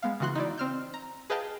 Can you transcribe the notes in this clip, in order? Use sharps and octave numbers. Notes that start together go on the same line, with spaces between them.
G#3 B3 F5
C#3 E3 F#4 C6 F#6
D#4 E4 D5
C4 F6 G6
A#5
G#4 B4 D#5 F5 G5 A5